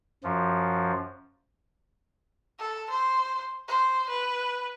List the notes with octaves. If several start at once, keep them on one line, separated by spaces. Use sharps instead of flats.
F#2 F3
A4
C5
C5
B4